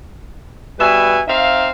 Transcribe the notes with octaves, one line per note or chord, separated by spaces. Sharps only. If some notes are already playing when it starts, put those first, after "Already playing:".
B2 G3 B4 E5 G#5
C4 D#4 E5 F5